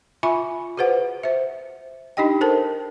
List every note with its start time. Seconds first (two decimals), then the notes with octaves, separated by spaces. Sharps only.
0.23 F4 E5 G#5 B5 C#6
0.77 F#4 G#4 B4 C5 F#5
1.23 C5 E5
2.17 D4 D#4 G4 D#5 G5
2.41 A4 A#4 C5 A5